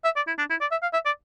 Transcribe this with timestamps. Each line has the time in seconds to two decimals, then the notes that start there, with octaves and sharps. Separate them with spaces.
0.05 E5
0.16 D5
0.27 E4
0.38 D4
0.50 E4
0.61 D5
0.72 E5
0.82 F5
0.93 E5
1.06 D5